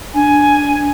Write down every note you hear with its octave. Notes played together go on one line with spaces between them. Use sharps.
D4 G#5